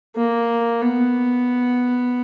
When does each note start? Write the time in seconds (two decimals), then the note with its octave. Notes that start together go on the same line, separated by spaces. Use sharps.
0.16 A#3
0.82 B3